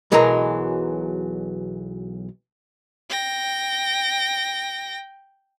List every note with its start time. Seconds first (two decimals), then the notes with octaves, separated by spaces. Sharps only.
0.12 B1 E3 F#3 G#3 A#4 A#5
3.10 G5 A#6